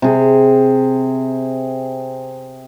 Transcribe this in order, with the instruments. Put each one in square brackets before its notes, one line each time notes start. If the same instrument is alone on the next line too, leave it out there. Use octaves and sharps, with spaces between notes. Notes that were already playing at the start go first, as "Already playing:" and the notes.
[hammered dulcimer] C3 G#4